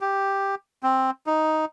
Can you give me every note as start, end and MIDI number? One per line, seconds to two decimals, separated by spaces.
0.01 0.55 67
0.83 1.11 60
1.27 1.65 63